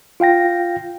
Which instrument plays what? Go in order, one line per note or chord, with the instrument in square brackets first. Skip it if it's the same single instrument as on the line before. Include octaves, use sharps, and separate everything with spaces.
[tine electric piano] F4 F5 G5 A#6